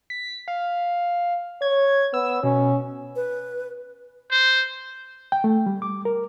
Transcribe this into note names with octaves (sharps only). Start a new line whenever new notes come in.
B6
F5
C#5 G#6
B3 E6
B2 C#4
B4
C5
G5
A3
G3
D6
A#4